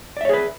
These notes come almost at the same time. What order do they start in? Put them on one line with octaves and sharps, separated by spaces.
D5 E5 C#5 G#4 B4